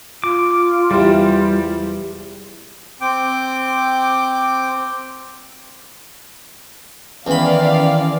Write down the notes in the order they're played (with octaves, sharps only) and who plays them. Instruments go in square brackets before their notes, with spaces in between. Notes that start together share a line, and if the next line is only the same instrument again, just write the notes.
[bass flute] F4 [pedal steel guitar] D6
[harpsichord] E2 C3 [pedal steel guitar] G3
[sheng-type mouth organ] C4 G5 D6
[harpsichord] E2 B5 [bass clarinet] D#3 [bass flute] C#4 [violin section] D5 F5